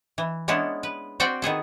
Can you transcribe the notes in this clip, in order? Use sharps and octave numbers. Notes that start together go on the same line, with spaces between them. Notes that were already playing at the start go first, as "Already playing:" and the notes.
E3
G#3 B3 C#4 D4 E4
B4
C4 F#4 D5 F#5 G5
D#3 B3 G#4 A4